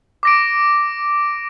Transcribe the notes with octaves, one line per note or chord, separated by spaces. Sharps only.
D6 A#6 D7